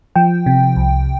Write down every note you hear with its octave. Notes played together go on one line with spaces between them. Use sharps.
F3 G5
C3
C2